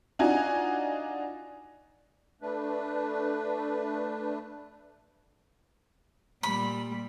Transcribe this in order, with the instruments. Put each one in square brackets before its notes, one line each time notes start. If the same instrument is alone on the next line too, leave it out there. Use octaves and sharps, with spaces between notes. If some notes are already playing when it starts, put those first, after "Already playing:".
[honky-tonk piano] D4 D#4 F4 F#4 G#5
[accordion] A3 D4 B4
[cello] A#2 G3 [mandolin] B5